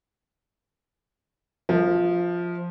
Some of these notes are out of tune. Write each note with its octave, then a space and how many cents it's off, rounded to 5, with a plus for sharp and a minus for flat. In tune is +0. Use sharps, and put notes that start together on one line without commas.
F3 +0 E5 -40